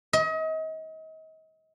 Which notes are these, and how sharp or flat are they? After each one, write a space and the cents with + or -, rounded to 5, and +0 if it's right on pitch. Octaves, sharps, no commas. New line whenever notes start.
D#5 +35